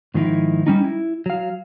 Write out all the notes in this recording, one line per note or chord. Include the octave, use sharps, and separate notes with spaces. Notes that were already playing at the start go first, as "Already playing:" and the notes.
G#2 D#3 F3 C#4 D#4 E4
G3 C#4 D#4
E4
F#3 F5